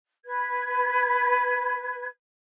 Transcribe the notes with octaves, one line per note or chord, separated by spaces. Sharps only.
B4 G#6